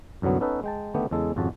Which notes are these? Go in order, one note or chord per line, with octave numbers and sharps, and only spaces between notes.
C2 F#2 D3 F#3 B3
B3 C#4 D#4 A4 B4
G#3 G5 A5
D3 D#3 A3 B3 G4
E2 C#3 G#3 A4
G#1 F2 C#3 F#4 A5